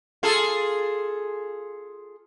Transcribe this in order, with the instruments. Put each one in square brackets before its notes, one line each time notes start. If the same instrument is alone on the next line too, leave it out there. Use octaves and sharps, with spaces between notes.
[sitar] F4 G#4 A4